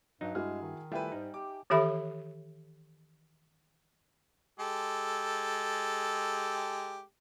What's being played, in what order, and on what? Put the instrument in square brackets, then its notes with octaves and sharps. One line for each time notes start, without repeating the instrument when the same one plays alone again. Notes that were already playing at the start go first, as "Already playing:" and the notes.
[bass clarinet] G2 [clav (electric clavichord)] F#3 D#4
[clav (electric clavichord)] G2 [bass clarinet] G#3 [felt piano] E4 F#4 F6 [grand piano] G#4
[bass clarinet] D#3
[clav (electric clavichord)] G3 A3 F4 [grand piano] E4 B4 [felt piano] E5 G5 G#5
[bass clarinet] G#2 [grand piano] G3 [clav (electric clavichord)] D#4
[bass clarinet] G4 [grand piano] D6
[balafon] D#3 E3 G4 A4 E5 B5
[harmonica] G#3 G4 A4